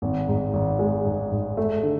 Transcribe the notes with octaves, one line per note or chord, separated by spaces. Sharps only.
G#1
G#2
G#1
G#3
G#2
G#2
A3
D3